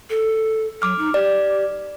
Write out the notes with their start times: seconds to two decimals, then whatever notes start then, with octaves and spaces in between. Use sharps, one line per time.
0.10 A4
0.82 F#3 D6 F6
0.98 D#4
1.14 G4 D5